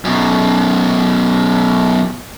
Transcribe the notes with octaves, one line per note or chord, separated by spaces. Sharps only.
F#2 B2